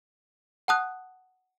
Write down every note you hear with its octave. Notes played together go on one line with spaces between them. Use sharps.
F#5 A5 D#6 F#6